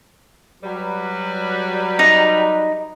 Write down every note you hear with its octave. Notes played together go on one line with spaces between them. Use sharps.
F#3 G3 B4
D#4